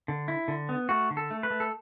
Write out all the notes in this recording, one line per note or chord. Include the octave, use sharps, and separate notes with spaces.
D3
E4
D3
B3
A3 F#4
D3
A4
A3
B4
A3
A4